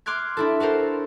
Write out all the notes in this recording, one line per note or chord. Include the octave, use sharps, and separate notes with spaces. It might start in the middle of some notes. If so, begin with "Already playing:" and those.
C6 D6 F6 F#6 G#6
D4 E4 A4
F#4 A4 A#4 C5